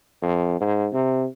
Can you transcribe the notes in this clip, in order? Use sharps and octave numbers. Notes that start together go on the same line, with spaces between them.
F2
G#2
C3